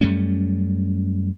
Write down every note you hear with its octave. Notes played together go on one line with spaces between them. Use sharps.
F#2 G3 A3 C#4